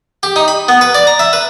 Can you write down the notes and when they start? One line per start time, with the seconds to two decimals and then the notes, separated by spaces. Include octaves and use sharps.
0.23 G4
0.36 D#4
0.48 B5
0.68 B3
0.81 B4
0.95 D5
1.07 A#5
1.19 E5
1.33 B4